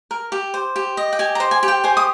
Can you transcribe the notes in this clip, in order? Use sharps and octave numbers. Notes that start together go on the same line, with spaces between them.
A#4
G4
C5
G4
D#5
G5
G4 G#5
A#5
C5
G#5
G4
G5
C5 G#5
D#6